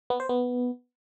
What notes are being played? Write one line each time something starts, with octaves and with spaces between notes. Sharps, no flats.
B3
C5
B3